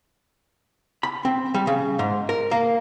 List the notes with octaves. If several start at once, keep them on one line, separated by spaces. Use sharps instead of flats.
B5
C4
G3
C#3
G#2
A#4
A#3